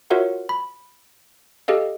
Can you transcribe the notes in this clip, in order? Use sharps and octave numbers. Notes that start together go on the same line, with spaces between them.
F4 F#4 A#4 C#5 E5 F#5
B5
G4 A4 D#5 F5